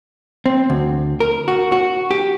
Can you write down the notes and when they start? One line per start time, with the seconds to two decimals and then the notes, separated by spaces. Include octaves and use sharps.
0.46 C4
0.70 D2
1.20 A#4
1.48 F#4
1.72 F#4
2.11 G4